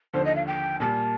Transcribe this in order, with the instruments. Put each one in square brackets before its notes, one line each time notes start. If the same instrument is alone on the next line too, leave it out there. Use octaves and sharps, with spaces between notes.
[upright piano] D#2 D3 F3 [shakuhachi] C5
[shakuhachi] D#5
F5
G5
[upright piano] A#2 G3 A#3 [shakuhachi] A5